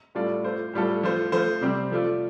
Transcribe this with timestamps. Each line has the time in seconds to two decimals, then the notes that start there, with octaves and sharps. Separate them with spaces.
0.15 A2 G3 F4 A4 D5
0.44 A3 F4 C5
0.73 A2 G3 F4 A4
1.03 F3 A3 F4 C5
1.32 F3 A3 F4 C5
1.61 C3 G3 C4 G4
1.91 F3 A3 F4 D5